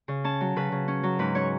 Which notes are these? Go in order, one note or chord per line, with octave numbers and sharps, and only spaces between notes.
C#3
C#4 A5
F#3
C#3 B4
C#3
C#4
F#3
G#2 B4
C#4 C#5